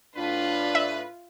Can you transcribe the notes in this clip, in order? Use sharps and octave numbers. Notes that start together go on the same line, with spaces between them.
A2 D4 F4 B4
E5